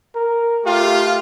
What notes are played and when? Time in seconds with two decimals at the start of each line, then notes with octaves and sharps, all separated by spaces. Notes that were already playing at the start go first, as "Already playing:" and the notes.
0.15 A#4
0.65 A3 F4 G4